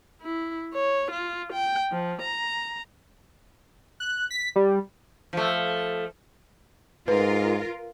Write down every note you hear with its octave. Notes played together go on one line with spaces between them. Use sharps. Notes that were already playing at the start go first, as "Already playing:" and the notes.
E4
C#5
F4
G5
F3
A#5
F#6
B6
G3
F3 A3
G#2 F4 A#4 B4